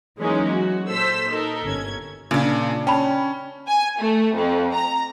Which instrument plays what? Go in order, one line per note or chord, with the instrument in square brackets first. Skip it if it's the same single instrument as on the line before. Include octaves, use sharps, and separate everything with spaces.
[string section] E3 F#3 G#3 A#3 C#4 D#4
F#4
A#2 A4 C5 E6 B6
D#4 A4 A#4
G1 C#4 G#6
[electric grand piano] A#2 [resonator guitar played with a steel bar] C#3 D4
[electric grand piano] C#4 [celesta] G5 A5 B5
[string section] G#5
A3
F2
A#5